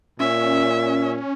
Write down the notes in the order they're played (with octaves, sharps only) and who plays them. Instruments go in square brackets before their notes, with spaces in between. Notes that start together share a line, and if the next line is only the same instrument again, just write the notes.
[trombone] A#2 [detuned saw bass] C#4 [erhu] E5